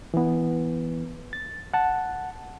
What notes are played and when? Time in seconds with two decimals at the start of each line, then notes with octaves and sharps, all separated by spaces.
0.14 E3 B3
1.33 A6
1.74 F#5 A5